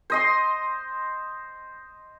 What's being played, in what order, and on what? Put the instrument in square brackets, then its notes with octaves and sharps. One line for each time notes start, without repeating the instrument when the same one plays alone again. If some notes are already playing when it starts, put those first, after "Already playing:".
[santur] C5 D#5 C6